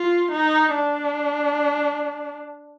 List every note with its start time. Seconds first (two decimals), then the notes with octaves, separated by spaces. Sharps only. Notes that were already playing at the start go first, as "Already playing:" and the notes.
Already playing: F4
0.32 D#4
0.75 D4